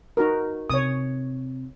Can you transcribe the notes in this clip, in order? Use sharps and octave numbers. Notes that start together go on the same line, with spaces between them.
D#4 F#4 A#4
C3 C#5 D#6